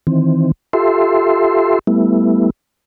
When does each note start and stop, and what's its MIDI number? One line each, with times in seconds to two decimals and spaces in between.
0.07 0.52 51
0.07 0.52 52
0.07 0.52 60
0.73 1.79 65
0.73 1.79 67
0.73 1.79 69
0.73 1.79 76
0.73 1.79 84
1.87 2.50 55
1.87 2.50 57
1.87 2.50 59
1.87 2.50 64